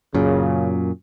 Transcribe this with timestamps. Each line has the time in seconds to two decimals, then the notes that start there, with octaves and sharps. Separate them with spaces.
0.15 F#2 A#2 C#3